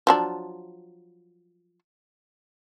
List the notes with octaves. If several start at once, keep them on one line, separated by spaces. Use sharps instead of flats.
F3 F#3 D4